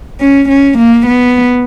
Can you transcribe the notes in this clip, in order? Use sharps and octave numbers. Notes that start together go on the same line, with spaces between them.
C#4
C#4
A#3
B3